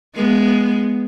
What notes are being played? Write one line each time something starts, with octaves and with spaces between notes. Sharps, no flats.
G#3 B3